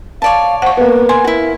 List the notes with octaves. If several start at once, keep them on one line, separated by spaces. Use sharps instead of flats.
C#5 D5 F5 A5
C5 F#5 C#6
A#3 B3 B4
G#5 C6
E4 F#4 A#4